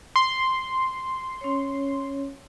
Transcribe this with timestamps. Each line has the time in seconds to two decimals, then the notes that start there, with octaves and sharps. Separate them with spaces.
0.16 C6
1.41 C#4 C#5